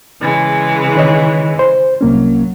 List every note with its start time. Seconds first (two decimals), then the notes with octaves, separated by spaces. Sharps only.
0.21 C#3 E3 G#3
0.96 D#3 C#5 D#5
1.59 C5
2.01 C2 F#3 A#3 C#4